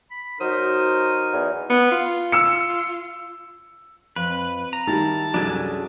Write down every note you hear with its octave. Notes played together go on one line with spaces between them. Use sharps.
B5
F#3 D#4 A#4 C5 D#6
E2 C#5
B3
F4
E6 C#7
F2 B4
A#5
D#3 G3 E4 A5
C2 F#2 F#3 D4 G#4 A4